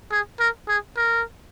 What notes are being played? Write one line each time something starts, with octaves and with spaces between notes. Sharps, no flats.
G#4
A#4
G#4
A#4